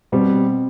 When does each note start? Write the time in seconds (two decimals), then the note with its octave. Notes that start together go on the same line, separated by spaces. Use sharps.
0.12 B2 G3 B3 C4